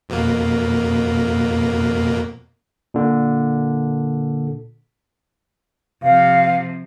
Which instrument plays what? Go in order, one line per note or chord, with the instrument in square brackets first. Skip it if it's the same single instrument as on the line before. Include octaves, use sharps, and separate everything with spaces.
[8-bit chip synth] F2 B2 A#3
[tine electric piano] A#2 D3
[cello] C3 F3 [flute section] F5